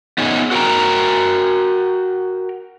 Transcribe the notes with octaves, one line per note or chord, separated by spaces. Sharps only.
B3 C#4 D#4 G#4
F#4 A#4 F#5 G5 A#5